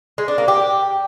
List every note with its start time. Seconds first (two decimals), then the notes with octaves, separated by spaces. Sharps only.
0.18 G#3
0.28 D4
0.38 A#3
0.48 G4